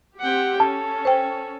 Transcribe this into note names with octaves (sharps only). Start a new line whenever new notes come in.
C4 G4 F#5 G5
C#4 A4 A5
C5 G5